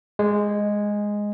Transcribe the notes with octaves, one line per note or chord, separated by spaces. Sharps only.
G#3